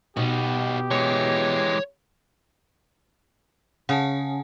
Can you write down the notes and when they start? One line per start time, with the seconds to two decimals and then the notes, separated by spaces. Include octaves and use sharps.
0.17 B2 D#4 F#4 G4
0.91 E3 G#3 C#5
3.89 C#3 F#5 G#5 A5